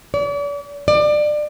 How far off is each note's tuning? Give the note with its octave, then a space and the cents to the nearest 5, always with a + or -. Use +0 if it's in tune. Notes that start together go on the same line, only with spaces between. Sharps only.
D5 -40
D5 +25